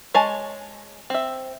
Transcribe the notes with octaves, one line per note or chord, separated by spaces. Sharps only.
G#3 C#5 G#5 A5
C4 E5